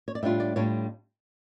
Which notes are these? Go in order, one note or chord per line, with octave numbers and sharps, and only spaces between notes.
C#5
D5
A2 G3 D4 F4 E5
D5
A2 G3 D4 F4 C#5